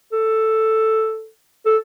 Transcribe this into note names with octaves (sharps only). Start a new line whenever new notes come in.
A4
A4